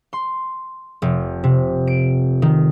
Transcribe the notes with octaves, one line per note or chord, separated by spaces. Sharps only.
C6
F1
C3
D7
D#3